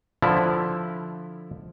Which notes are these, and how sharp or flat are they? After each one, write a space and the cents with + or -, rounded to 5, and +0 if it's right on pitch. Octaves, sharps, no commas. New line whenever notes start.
D3 +0 F3 +0 E4 +0